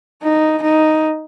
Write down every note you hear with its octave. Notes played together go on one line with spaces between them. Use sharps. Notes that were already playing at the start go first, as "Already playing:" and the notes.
D#4
D#4